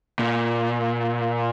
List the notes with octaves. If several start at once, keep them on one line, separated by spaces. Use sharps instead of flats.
A#2